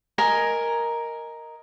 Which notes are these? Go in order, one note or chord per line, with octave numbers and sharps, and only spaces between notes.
A#4 D#5 G#5